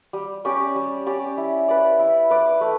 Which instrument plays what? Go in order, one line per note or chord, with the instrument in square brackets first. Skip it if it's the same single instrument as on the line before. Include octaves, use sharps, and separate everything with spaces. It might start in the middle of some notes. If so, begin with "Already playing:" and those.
[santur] G3
C#4 G4 D5
G3
C#4 G4 D5
E4
B4 D5
E4
B4 D5
A3